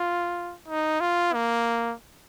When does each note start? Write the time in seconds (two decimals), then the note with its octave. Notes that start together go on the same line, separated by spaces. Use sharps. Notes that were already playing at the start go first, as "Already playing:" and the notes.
Already playing: F4
0.68 D#4
1.01 F4
1.34 A#3